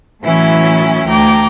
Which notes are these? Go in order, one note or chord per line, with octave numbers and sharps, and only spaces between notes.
A2 E3 F#3 C#4 E4
D2 G5 A#5 D6